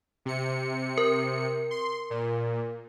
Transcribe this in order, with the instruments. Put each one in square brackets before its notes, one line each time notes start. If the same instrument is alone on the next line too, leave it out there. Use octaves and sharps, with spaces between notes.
[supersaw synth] C3 C#7
[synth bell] A#4
[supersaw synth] C6
A#2